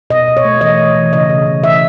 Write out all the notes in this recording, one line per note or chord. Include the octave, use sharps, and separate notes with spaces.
B2 D#5
B2
C#5
A3
E3 D#5
E3
E3
C#3 D#5
C#3
C#3
E3 E5